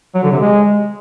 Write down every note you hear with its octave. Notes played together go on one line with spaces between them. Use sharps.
F#3
D3
C3
G#3